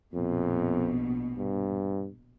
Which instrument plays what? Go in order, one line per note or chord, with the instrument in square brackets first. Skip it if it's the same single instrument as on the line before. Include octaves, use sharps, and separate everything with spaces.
[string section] A#1 B2 [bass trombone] F2
[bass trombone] G2